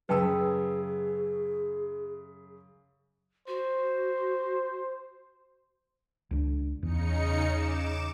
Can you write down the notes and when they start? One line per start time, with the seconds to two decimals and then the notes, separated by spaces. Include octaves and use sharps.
0.09 F#2 C#3 G#4 B4 G5 A5 E6
3.48 F#4 C5
6.31 C#2 D4
6.83 E2 C#3 D#4 C#7
7.51 D6 E7